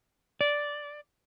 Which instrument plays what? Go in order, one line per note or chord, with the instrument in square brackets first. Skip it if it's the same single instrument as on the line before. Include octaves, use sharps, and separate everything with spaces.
[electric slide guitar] D5